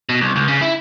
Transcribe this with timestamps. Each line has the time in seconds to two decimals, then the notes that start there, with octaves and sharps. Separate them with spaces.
0.09 B2
0.21 C2
0.36 C#2
0.48 C#3
0.61 E4